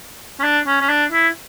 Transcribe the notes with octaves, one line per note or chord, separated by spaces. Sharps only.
C#4
D4
C#4
C#4
D4
E4